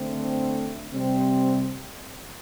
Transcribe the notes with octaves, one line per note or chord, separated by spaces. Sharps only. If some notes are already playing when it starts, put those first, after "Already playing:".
Already playing: D3 A3 C4
C3 G3 C4